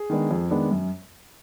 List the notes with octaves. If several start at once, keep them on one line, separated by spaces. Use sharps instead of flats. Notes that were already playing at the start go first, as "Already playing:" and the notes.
Already playing: G#4
D#3 G#3 B3 D4
F2
D#3 G#3 B3 D4
F#2